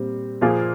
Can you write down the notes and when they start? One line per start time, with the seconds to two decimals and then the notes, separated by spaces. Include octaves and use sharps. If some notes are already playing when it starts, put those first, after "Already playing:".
Already playing: A#2 G3 C4
0.41 A#2 F3 A#3 F4 G#4